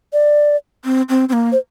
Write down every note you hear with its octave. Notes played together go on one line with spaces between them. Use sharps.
D5
C4
C4
C4
A#3
C5